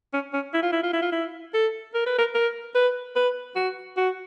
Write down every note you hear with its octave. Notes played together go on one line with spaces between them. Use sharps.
C#4
C#4
E4
F4
E4
F4
E4
F4
E4
A4
A#4
B4
A#4
A#4
B4
B4
F#4
F#4